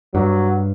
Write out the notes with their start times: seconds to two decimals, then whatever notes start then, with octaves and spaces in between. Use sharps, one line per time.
0.14 G2 F#3